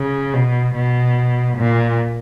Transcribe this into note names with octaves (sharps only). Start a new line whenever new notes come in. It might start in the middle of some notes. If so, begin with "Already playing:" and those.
Already playing: C#3
B2
B2
A#2